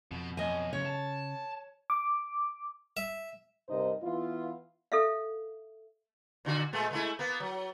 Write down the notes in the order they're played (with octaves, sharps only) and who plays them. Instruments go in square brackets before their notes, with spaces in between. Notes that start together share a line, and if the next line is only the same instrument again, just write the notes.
[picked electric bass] F2 [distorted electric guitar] B2
[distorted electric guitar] B1 [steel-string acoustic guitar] D#5 G#5
[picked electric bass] C#3 [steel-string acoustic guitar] C#5
[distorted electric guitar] A5
[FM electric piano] D6
[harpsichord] E5
[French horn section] G2 C3 D#4 A#4 C5 D#5
E3 B3 E4 F4
[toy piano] A4 E5 F5
[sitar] A#2 D3 F#4
A#2 G#3 A3
G#3 A3 E4
A#3 B3
F#3